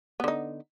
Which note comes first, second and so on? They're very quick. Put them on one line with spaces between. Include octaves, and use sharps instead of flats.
B3 D3 D#4